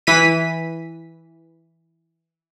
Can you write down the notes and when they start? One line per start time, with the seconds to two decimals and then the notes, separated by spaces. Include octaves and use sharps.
0.07 E3 B6 D#7